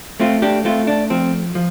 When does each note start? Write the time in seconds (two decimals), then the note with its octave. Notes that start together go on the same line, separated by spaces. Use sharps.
0.20 A3 C4 F4
0.42 D4 G4
0.65 A3 C4 F4
0.87 D4
1.10 F3 C4
1.55 F3